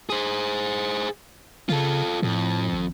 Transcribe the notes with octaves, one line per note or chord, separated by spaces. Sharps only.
G#4 C5
C#3 F4 A4
F2 A2
G#1